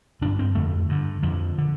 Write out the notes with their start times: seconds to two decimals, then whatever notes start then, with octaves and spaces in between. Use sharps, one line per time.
0.21 G2 D3 D4
0.39 C4
0.55 F2 D3 A3
0.89 G2 D3
1.22 F2 D3 F3
1.58 D3